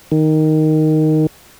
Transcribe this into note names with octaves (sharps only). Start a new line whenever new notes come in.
D#3